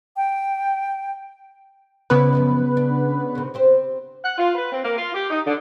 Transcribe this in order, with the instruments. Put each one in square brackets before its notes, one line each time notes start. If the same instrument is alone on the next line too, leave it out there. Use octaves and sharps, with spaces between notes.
[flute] G5
[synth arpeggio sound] C#3 B3 B4 [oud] E4 C#5 D5
[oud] F#2 F3 D#5
D4
C3 D#3
C4 G4 C5
[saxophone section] F#5
F4
B4
C4
A#3
F4
G4
D#4
D3